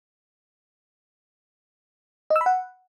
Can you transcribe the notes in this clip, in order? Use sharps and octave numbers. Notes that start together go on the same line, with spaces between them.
D#5
E6
B5
F#5